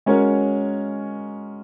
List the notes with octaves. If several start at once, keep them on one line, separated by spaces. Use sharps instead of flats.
G#3 C#4 F#4 A#4 C#5